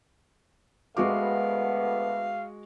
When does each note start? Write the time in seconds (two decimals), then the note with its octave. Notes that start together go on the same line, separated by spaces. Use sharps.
0.97 D2 G#3 A3 B3 F#4 F5 D6